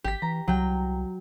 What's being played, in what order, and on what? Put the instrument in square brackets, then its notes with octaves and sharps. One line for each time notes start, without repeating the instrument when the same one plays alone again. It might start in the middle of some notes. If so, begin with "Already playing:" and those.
[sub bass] G#1 [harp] G4 B6
[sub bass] E3 [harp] A#5
[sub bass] C2 [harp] F#3 G5